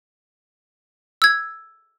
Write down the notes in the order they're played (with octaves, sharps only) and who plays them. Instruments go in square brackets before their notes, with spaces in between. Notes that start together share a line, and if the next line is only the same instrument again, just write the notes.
[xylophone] E6 G#6